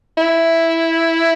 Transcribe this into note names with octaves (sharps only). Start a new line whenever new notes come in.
E4